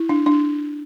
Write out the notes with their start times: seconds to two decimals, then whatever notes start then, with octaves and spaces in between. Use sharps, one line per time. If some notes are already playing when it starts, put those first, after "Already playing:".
Already playing: E4
0.09 D4
0.26 D4